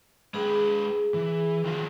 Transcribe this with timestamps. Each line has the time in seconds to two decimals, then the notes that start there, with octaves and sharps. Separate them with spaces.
0.34 G#3 G#4 B4
1.14 E3
1.64 D#3 F4 F#4